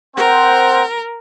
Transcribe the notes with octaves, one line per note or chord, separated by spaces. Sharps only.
C4 A#4 C5 F#5